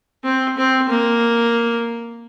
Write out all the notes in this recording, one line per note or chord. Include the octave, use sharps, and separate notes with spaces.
C4
C4
A#3